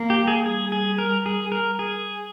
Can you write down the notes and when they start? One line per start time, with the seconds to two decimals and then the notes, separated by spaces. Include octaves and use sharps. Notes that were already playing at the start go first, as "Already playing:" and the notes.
Already playing: A#3
0.10 G4
0.27 G#4
0.45 G3 G#4
0.72 G#4
0.98 A#4
1.26 G#4
1.52 A#4
1.79 G#4